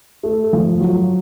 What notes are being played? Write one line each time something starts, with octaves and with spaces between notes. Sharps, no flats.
A3
F3
F#3